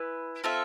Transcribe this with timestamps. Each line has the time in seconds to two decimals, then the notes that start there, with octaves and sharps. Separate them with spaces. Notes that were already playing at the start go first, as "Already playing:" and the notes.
Already playing: E4 B4 G#5
0.44 C4 F4 A4 E5